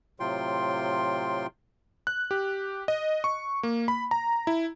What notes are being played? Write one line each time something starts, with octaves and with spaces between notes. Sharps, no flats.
A2 C3 F#3 F4 G5 C6
F#6
G4
D#5
C#6
A#3
B5
A#5
E4